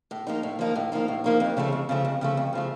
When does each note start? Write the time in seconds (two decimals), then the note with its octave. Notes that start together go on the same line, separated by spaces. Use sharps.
0.11 A2
0.27 F3 A#3 D#4
0.43 A2
0.59 F3 A#3 D#4
0.75 A2
0.92 F3 A#3 D#4
1.08 A2
1.24 F3 A#3 D#4
1.40 F2
1.57 C#3 F3 A3
1.72 F2
1.89 C#3 F3 A3
2.05 F2
2.21 C#3 F3 A3
2.37 F2
2.53 C#3 F3 A3